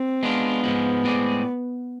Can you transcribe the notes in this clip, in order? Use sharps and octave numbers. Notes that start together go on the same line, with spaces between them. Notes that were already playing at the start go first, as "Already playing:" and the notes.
Already playing: C4
G#3 B3 D4 F4
G#2 F3 G#3
A2 G#3 C4 G#4 D5